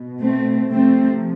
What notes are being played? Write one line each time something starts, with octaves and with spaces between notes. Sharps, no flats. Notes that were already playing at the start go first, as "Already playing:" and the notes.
Already playing: B2
A3 C4
C3 F3 A3 C4